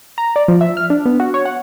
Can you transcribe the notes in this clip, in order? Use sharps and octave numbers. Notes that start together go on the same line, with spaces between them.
A#5
D5
F3
E5
F6
D4
B3
F#4
C#5
F#5